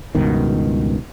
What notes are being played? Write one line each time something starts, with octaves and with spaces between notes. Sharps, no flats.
C#2 G2 B2 D#3